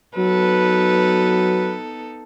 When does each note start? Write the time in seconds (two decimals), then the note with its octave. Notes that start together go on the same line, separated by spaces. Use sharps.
0.17 F#3 B3 D#4 A4 B4